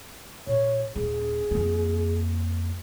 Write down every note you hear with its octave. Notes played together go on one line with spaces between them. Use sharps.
A#2 C#5
D#1 C#4 G#4
F2 A#3